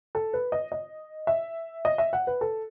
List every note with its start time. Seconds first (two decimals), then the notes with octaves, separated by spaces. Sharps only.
0.15 A4
0.33 B4
0.52 D#5
0.72 D#5
1.27 E5
1.85 D#5
1.98 E5
2.13 F#5
2.27 B4
2.41 A4